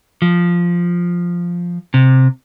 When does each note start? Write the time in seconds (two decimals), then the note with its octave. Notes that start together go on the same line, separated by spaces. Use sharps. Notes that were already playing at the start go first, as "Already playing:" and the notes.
0.22 F3
1.94 C3